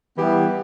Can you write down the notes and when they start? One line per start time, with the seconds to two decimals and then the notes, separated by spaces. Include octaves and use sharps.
0.17 E3 G3 B3 E4 G4